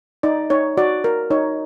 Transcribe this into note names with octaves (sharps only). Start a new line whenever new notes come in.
D#4 D5
D#4 C#5
F#4 D5
A#4
D#4 C#5